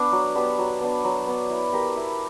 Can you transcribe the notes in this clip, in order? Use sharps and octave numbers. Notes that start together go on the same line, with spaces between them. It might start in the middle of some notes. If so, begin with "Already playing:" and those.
Already playing: B3 D4
F#3
B3 D4 G4
F#3
B3 D4
F#3
B3 D4
E4
G4 A#4
E4